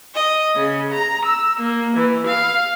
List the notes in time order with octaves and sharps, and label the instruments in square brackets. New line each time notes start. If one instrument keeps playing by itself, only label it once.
[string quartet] D#5
C#3
A#5
E6
A#3
E3
F5